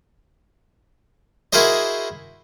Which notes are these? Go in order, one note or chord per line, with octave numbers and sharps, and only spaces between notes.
E4 F#4 G#4 A#4 C5 D#5